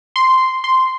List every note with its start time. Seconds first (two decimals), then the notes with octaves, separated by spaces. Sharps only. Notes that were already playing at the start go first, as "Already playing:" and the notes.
0.16 C6
0.64 C6